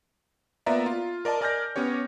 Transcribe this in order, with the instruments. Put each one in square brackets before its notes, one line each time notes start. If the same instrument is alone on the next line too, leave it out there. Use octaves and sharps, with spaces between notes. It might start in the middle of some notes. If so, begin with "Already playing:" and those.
[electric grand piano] A#3 B3 F4 D5 E5 A#5
F4
A#4 D5 D#5 A5
A#4 D5 G#5 F6 G6 A#6
B3 C#4 G4 C#5